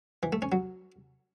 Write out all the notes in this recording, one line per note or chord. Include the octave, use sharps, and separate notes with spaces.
E3
A3
C#4
F#3